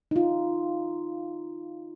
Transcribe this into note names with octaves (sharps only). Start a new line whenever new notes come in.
D#4 F4